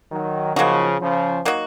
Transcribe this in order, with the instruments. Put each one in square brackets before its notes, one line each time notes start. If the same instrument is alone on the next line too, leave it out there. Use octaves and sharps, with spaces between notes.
[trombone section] D#3 F#3
[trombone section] C#3 F3 [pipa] F#3 A#3 D#4 F#4
[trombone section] C#3 F3
[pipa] F#3 A#3 D#4 F#4